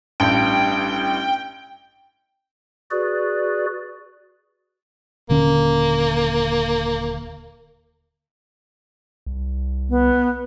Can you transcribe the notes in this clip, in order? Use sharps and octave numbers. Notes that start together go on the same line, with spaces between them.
A1 G2 G5
F#4 G#4 B4 D5
D#1 D3 A#3 C#4
C2
B3